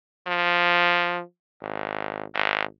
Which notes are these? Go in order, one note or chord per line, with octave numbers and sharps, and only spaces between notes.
F3
G#1
G#1